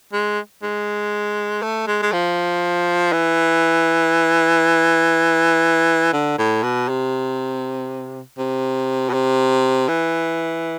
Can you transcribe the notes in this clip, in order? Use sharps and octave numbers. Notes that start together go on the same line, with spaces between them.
G#3
G#3
A3
G#3
G#3
F3
E3
D3
A2
B2
C3
C3
B2
C3
E3